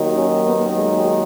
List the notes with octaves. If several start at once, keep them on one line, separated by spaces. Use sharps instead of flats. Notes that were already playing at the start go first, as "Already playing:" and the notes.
Already playing: D#2 D#3 F#3
C#4
B3
G#3